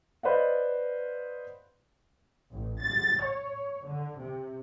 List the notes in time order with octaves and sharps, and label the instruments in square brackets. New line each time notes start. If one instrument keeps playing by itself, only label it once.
[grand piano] B4 C5 D5 D#5 F5 F#5
[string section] A1
A6
C#5
D3
C3